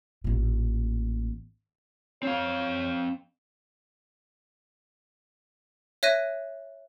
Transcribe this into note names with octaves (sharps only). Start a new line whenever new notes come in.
A1 A#2
C4 C#5 F5
C#5 E5 F#6 A#6 D#7